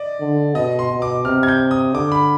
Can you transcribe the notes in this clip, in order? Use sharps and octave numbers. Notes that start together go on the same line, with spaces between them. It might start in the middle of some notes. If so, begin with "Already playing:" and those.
Already playing: D5 D#5
D3
B2 D#5
C6
B2
D6
C3 F6
G#6
G6
D#6
D3 D6
B5